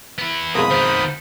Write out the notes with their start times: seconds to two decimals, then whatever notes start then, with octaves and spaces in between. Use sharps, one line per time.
0.19 B3 E4
0.55 B1 F2 G#3 A#4 B5 D#6
0.71 D#3 B3 C5